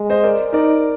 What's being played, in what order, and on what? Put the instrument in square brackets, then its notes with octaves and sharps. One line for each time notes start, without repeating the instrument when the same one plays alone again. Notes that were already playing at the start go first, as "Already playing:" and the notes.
Already playing: [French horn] G#3
[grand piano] C5 D#5
A#4 D5
[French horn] D#4 [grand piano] A#4 D5